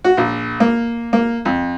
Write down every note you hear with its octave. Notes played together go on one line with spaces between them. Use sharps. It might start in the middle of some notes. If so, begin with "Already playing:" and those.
F#4
A#1
A#3
A#3
F2